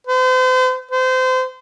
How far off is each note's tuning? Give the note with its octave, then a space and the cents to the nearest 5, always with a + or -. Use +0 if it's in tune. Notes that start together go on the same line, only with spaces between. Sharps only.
C5 -40
C5 -30